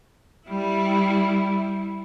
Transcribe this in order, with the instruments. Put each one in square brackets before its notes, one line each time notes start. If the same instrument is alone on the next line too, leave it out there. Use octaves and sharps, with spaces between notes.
[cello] G3 E4